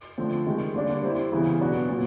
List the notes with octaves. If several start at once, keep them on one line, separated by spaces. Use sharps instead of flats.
D3 F3 A3 C4
C3 D#3 G#3
D3 G3 A#3 D4 G4
G3 C4 E4
C#3 E3 G3 B3 E4
B2 F#3 B3 D4 F#4
A#2 F#3 B3